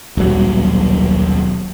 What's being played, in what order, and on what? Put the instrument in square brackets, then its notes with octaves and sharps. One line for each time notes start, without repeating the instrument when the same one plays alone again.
[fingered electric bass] D#1 B1 F#3 G3